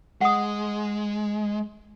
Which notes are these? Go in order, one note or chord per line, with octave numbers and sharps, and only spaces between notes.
G#3 F#5 D#6